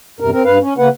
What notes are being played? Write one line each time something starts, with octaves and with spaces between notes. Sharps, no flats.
E2 G2 C3 A#4
C4 A#4
G2 B4 F5
C#4
C#3 A#3 B4 F#5